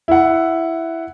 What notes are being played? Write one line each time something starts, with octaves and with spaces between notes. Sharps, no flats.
E4 F#5